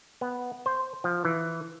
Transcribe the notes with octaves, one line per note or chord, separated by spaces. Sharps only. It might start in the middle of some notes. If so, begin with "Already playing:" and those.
B3
C5
F3
E3